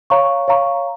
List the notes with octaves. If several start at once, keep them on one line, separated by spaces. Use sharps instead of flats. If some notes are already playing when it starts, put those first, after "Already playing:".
C#5 F5 A#5 C#6
C#5 F5 A#5 C#6